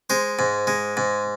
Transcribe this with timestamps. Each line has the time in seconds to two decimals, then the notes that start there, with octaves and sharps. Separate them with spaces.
0.10 G#3 C5
0.39 G#2
0.67 G#3
0.97 G#2